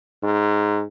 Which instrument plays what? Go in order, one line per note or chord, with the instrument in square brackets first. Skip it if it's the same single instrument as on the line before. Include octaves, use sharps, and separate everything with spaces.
[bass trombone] G#2